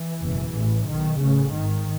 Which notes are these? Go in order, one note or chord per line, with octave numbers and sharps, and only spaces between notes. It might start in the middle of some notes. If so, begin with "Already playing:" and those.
Already playing: E3
F#1 E2 B2
A1 A2
B1 B2 D#3
A1 A2 C#3
G#1 G#2 D#3